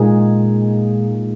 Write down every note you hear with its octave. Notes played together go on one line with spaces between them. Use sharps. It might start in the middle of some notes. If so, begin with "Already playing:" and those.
Already playing: A#2 G#3 D#4 G#4